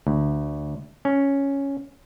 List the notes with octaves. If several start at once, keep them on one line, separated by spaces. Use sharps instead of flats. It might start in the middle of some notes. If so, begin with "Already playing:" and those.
D2
C#4